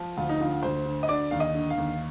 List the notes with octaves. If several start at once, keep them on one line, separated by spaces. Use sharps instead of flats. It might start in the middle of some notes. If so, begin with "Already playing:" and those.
Already playing: F3
D2 F4
D#4
D3 F4
D2 C5
D3
D#5
D3 D5
D#2 F5
D#5
D3
F5
D#2